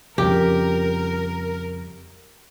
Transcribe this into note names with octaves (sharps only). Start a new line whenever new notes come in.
F2 C#3 G3 G4 A#4